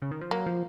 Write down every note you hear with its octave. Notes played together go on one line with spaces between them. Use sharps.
C#3
D#3
F3
F#3 A#3
F3